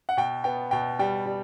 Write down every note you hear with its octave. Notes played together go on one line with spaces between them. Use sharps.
F#5
B2 G5
B3 G5
B2 G5
G3 G5
G3